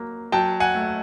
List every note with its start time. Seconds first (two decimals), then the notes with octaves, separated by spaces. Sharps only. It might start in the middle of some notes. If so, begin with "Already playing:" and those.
Already playing: F#3 A#3
0.32 F#3 G5 A5
0.60 F#5 G#5
0.75 A3